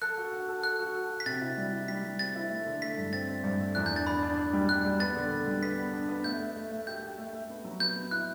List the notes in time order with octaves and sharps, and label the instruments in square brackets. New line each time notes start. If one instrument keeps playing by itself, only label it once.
[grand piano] A4 [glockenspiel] F#6
[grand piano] F#4
F#4
A4
[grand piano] A4 [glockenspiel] F#6
[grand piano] F#4
A4
F#4
[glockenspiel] B6
[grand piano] C3 [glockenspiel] A6
[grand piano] E4
G3
E4
[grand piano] G3 [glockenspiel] B6
[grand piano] G3
[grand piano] C4 [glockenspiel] A6
[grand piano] E4
A3
D3
[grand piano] A3 [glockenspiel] B6
[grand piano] G2
[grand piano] C4 [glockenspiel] A6
[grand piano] C4
G2
A3
[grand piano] E2 [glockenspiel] F#6
[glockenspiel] G6
[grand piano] D4
[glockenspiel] A6
[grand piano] D4 [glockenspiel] B5
[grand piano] D4
D4
G3
[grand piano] G3 [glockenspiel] F#6
[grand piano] G3
[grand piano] B3 [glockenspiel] A6
[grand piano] D3
D3
G3
[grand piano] B3 [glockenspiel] B6
[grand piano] D4
D4
B3
[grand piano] A3 [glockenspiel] G6
[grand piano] A3
A3
A3
[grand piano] G4 [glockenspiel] G6
[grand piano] G4
A3
A3
B3
F#3
[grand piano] B3 [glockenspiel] G6
[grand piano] B3
[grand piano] E4 [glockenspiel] F#6